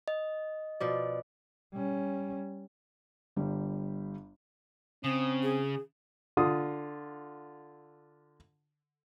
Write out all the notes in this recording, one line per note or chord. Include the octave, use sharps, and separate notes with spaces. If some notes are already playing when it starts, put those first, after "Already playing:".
D#5
B2 F3 D5
G3 C#4
G1 G3
C#3 C4 D#6
G#4
D3 F4 D#6